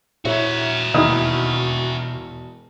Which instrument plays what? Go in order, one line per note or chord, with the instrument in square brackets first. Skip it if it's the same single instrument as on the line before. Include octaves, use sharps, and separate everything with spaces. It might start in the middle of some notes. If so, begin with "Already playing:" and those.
[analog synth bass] A#2 [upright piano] E4 C#5 [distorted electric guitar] F#4 E5
[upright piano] E1 D#6 [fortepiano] D#2 D#4 E4 [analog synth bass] B2